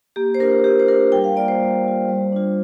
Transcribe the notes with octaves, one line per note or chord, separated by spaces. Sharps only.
A#3 G4
C5
D4 F4 A#4
A#3 G4
C5
D4 F4 A#4
G3 G5
F5
A#3 F4 D5
C5
G3
A#3 F4
G3
D4 F4